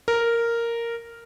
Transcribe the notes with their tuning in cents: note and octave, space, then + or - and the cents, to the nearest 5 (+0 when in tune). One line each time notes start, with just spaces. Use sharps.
A#4 -5